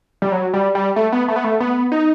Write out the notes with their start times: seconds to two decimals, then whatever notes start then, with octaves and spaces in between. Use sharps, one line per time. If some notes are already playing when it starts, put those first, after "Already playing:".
0.22 G3
0.32 F#3
0.54 G3
0.75 G3
0.96 A3
1.12 B3
1.28 A3
1.36 B3
1.44 A3
1.60 B3
1.92 D#4